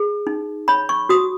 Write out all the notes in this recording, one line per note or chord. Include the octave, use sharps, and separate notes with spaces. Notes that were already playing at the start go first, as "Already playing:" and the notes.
Already playing: G#4
D#4
C#5 B5
C#6
F#4 D#6